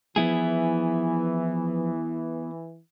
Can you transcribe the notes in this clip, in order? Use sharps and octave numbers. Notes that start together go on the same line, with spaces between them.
E3 F3 B3 E4 G#4